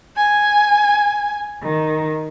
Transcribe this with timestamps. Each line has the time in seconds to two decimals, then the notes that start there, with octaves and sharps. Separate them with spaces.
0.15 G#5
1.64 D#3